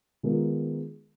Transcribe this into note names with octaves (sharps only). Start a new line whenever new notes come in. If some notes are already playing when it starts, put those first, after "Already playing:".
D#3 G#3 B3 F4 A#4